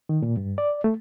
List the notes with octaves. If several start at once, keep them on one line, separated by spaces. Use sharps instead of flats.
D#3
A#2
G2
D5
A3